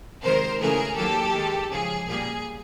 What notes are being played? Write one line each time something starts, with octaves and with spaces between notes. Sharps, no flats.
C3 D#3 G#3 A#4 C5
C#3 E3 A3 G#4 A#4
D#3 F#3 A#3 G4 A4
D#3 G#3
C#3 F3 G#3 G#4
A#2 G3 A#3 G#4